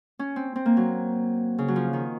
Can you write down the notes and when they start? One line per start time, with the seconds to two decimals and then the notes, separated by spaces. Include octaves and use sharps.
0.19 C#4
0.36 C4
0.56 C4
0.66 A#3
0.77 F#3
1.58 C#3
1.68 F#3
1.76 F3
1.93 D#3